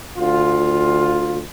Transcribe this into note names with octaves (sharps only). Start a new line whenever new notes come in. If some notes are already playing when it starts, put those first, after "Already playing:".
D2 F4